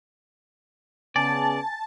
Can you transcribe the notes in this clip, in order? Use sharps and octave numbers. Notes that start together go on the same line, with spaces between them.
C#3 B3 D5 G#5 A5